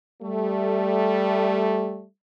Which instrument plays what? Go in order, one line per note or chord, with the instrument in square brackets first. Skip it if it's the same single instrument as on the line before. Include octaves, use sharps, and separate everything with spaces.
[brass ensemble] G3 A3